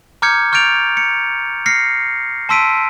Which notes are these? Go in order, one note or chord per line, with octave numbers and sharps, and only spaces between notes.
A#5 D6 F6 G6 G#6 C#7
C#6 F6 G6 A6 D7 F7
C#7
F6 A#6 C7 C#7
A5 C6 E6 B6 D7 D#7